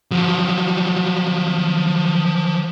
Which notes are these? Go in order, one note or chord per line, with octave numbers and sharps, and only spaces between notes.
F3 F#3